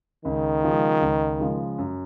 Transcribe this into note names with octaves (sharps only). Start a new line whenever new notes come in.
C#2 D#3
C#3 F3 G#3
C#2
C#3 F3 G#3
F#2